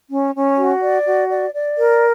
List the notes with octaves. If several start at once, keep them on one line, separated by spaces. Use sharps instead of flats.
C#4
C#4
F#4
D5
F#4
D5
D5
A#4